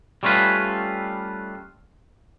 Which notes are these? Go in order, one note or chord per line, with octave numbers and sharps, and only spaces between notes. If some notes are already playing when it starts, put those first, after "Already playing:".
G3 A3 C#4 F4 B4